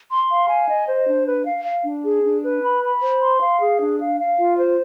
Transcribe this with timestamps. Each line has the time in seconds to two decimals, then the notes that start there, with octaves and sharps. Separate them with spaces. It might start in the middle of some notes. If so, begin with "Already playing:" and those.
0.08 C6
0.28 F5
0.48 G#5
0.67 D#5
0.87 C5
1.06 D4
1.26 B4
1.45 F5
1.65 F5
1.84 D4
2.03 G#4
2.24 D4
2.43 B4
2.62 B5
2.83 B5
3.02 C5
3.21 C6
3.41 F5
3.61 G#4
3.80 D4
3.99 F5
4.20 F5
4.39 F4
4.58 C5